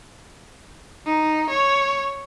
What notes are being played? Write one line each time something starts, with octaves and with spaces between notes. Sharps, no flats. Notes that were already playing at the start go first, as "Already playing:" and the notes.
D#4
C#5